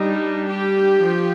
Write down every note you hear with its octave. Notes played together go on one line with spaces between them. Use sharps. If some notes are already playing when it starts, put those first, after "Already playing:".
Already playing: G3 D4 D#4
G4
F3